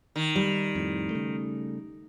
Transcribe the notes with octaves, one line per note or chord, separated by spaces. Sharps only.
D#3
G3
F2 A2
C#3 A3